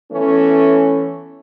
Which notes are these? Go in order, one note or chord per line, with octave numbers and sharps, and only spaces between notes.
E3 A3 B3 C#4